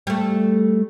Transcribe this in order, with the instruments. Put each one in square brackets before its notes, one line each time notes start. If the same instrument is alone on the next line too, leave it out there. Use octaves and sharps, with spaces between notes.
[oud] G3 A3